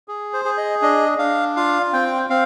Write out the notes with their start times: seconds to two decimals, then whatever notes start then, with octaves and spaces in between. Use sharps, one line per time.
0.08 G#4
0.33 C5
0.45 G#4
0.58 D#5
0.82 D4 D#5
1.18 D4 F5
1.56 F4 F5
1.93 C4 G5
2.30 C4 F5